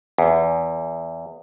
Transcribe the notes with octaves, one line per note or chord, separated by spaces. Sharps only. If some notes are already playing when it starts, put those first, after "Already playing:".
E2